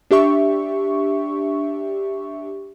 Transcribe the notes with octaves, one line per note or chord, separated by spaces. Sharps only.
D4 G4 E5 C#6